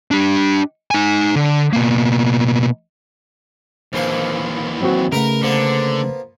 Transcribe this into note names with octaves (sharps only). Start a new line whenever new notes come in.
D4 G4
D#4 G#5
D3
B2 A#3
A#1 D#2 E3 F3 F5
F#3 C4 F#4
C#3 A3 D#4 A#4 B4 F#5
D3 F3 A#3 B3